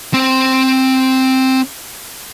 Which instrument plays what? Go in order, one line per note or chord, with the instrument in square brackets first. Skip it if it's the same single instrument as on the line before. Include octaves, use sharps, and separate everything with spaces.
[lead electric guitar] C4 C5